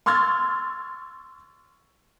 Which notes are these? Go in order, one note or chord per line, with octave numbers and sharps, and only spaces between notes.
C6 C#6 E6 F6 G#6 A6